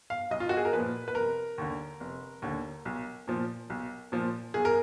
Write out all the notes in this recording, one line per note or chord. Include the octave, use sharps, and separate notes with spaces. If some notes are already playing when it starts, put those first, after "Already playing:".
F5
B1 D#5
F4
F#4
G#4
A#4
A#2 F3 B4
B4
F1 A#4
D#2 D3
F1
D#2 D3
B1
A#2 F3
B1
A#2 F3
B1 G#4
A#4